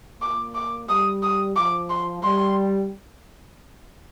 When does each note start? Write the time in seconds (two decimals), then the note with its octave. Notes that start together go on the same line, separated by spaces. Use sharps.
0.21 A#2 A#3 D6
0.55 D6
0.89 G3 D#6
1.23 D#6
1.56 F3 D6
1.90 C6
2.23 G3 C6